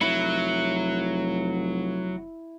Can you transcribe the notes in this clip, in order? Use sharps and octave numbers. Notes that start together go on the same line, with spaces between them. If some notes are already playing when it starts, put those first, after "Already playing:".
F1 F#3 E4